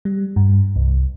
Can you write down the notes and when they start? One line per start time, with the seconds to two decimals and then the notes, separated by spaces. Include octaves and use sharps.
0.05 G3
0.36 G2
0.76 C2